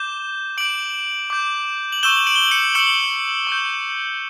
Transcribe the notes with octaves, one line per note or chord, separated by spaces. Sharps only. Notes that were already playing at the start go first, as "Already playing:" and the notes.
Already playing: D6 G6 E7 G7
D6 G6 D7 F#7
D6 G6
F#7
C#6 E6 G6 E7 G7
D7 F#7
G7
F#7
C#7 E7
C#6 E6 G6 C#7 E7
C#6 E6 G6